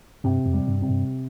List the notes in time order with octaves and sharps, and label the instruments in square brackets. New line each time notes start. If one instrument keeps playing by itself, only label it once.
[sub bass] G2 [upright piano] C3
[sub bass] F2
[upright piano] G3
[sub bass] G2
[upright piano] C3
[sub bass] G2